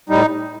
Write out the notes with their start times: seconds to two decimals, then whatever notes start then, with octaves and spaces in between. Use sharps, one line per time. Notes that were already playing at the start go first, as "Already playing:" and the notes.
0.09 A2 G3 D#4